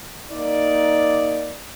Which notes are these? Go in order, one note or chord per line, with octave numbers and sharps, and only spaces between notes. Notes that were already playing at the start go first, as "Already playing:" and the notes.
A#3 D#4 D5